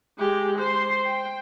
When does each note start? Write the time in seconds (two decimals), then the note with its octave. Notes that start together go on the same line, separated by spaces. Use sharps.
0.18 G#3 G4
0.59 C5 C6
1.06 G5